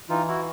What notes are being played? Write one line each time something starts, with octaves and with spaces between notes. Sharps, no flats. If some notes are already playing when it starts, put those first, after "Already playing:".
E3 D#4 F4
E4 F#4